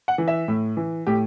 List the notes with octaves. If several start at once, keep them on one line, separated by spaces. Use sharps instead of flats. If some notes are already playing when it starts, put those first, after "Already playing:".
F#5
E3
E5
A2
E3
A2 G4